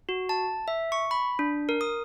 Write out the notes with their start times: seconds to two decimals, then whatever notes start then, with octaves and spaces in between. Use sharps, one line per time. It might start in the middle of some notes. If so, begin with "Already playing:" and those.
0.09 F#4
0.29 A5
0.68 E5
0.92 C#6
1.11 B5
1.39 D4
1.69 A#4
1.81 D#6